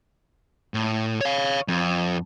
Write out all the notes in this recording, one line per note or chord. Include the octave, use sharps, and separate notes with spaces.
A2
C#5 F5
F2